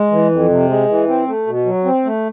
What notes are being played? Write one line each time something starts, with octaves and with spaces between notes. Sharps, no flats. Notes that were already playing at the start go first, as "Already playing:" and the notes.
Already playing: G#3
E3
F2
C3
G#3
E3
C4
A3
B2
F#3
C4
A3